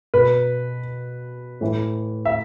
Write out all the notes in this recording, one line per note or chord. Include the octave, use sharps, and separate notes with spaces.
B2 B4
A2 E3
E5